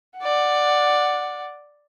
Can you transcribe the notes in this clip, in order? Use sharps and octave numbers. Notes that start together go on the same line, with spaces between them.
D5 F#5